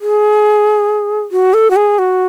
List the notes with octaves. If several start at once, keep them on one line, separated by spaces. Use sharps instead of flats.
G#4
F#4
A4
F#4
G#4
F#4